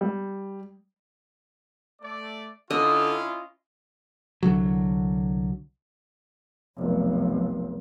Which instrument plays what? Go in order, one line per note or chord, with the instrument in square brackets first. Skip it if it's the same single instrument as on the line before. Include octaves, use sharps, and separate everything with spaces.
[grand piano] G3
[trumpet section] A3 D5
[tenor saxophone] D3 [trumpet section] C#4 E4 F4 [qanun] D#5
[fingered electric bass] C2 D3 F#3
[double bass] F1 B1